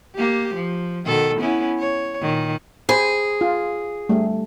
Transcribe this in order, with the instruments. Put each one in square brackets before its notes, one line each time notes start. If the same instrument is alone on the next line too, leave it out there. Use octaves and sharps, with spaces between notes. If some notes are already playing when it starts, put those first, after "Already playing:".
[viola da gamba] A#3 G4
F3
B2 D#3 A4
B3 C#4 E4
C#5
A#2 D#3
[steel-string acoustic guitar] G#4 [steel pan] C5 G#5 B5
[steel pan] F4
G3 A3